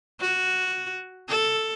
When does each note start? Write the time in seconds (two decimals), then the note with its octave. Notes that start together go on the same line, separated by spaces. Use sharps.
0.21 F#4
1.29 A4